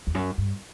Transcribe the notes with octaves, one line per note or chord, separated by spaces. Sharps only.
E2
F#2
G2